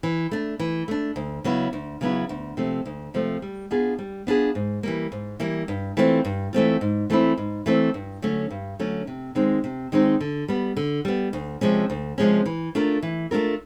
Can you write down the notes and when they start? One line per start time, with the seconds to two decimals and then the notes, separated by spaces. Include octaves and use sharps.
0.03 E3
0.31 A3 D4
0.59 E3
0.88 A3 D4
1.16 D2
1.44 C#3 F#3 B3 E4
1.73 D2
2.01 C#3 F#3 B3 E4
2.29 D2
2.57 C3 F3 A3
2.86 D2
3.14 C3 F3 A3
3.42 G3
3.71 B3 D4 F4 G#4
3.99 G3
4.27 B3 D4 F4 G#4
4.55 G#2
4.83 E3 G3 A#3
5.12 G#2
5.40 E3 G3 A#3
5.68 G2
5.97 E3 A3 C4 F4
6.25 G2
6.53 E3 A3 C4 F4
6.81 G#2
7.10 E3 A3 C4 E4
7.38 G#2
7.66 E3 A3 C4 E4
7.94 G2
8.22 D3 F#3 A3 C#4
8.50 G2
8.79 D3 F#3 A3 C#4
9.07 C3
9.35 D#3 G#3 C4 D#4
9.64 C3
9.92 D#3 G#3 C4 D#4
10.21 D3
10.48 G3 B3
10.77 D3
11.05 G3 B3
11.33 D2
11.61 C3 F3 G#3 C#4
11.90 D2
12.18 C3 F3 G#3 C#4
12.46 E3
12.75 A3 D4 F4 A#4
13.03 E3
13.31 A3 D4 F4 A#4